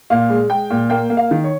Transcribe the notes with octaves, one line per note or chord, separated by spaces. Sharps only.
A#2 F5
G#3
G#3 G5
A#2
A#3 G5
A#3
F5
D#3
C#5